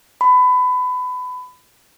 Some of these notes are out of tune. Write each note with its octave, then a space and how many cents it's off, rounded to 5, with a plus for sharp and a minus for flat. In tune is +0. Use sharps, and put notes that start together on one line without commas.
B5 +25